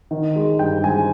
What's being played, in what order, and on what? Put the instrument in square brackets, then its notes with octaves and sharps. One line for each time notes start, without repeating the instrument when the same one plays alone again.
[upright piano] D#3
G#3
G2 G5
G#3 G#5